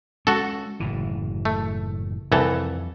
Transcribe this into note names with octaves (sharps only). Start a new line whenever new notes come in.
G#3 C#4 F#4 A4
F#1 A2 E3
A3
C2 F2 E3 A4